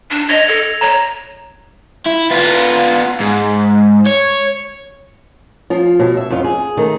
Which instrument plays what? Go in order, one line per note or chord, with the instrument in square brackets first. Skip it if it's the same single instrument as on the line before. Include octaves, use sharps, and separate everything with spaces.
[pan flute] D4
[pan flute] D#5 [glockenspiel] G#6 A#6 F7
[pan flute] A4
[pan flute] C#5 [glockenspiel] A#5
[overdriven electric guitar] E4
B3 F4
G#2
C#5
[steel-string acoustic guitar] F3 F4
B2
E5
F2 F4
G#4
D#3 A3